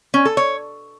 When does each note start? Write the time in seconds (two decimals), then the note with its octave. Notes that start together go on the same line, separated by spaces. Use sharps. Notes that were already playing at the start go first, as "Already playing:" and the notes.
0.14 C#4
0.25 A4
0.37 C#5